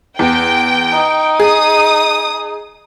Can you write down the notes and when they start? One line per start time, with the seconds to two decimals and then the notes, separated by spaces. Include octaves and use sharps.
0.19 E2 G5
0.92 D#4
1.40 G#4 D#6